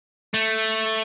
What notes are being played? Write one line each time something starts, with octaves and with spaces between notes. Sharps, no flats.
A3